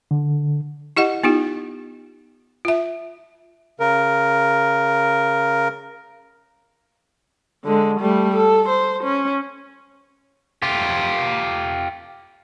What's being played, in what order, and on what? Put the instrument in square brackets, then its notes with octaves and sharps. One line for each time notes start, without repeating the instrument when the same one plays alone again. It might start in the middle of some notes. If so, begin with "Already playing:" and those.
[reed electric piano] D3
[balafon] E4 G4 D#5 F#5
B3 D#4 F4 G4
F4 E5
[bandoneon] C#3 A#4
[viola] D3 G#3
G3 A3
A4
C5
C#4
[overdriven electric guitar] F4 G4